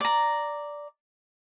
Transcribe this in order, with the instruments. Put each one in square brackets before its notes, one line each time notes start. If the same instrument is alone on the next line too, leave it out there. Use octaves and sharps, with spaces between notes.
[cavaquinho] D5 A#5